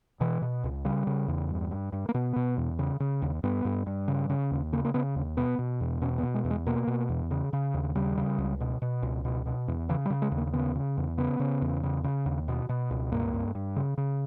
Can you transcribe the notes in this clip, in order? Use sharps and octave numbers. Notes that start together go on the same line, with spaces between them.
B2 E3
B2
C#2
C#3 G3
C#3
E2
G2
G2
G2
A#3
B2 B3
B2
E2
C#3
C#3
D#2
G2 B3
G2
G2
C#3
C#3
D#2
C#3 A#3
A#3
C#3 B3
D#2
B2 B3
B2
E2
B2 C#4
B3
B2
G#3
E2
G#3
B2 A#3
B2
E2
C#3
C#3
D#2
C#3 G3
C#3
C#2
B2
B2
C#2
B2
B2
E2
C#3 E3
G3
C#3
G#3
D#2
A#3
C#3 B3
C#3
E2
C#3 B3
C#3
E2
C#3
C#3
D#2
B2
B2
C#2
G2 A#3
G2
G2
C#3
C#3